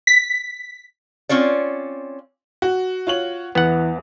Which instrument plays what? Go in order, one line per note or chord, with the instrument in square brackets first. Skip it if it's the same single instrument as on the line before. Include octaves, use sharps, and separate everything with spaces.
[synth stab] B6
[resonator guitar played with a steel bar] C4 C#4 F4 C#5 D5
[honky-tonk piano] F#4
[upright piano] F4 C#5 F#7
[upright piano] E2 [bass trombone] E3 [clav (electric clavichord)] B3 F#5